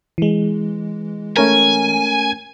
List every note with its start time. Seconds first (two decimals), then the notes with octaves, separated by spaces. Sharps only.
0.18 E3 G#3
1.37 A3 C#4 A#4 G#5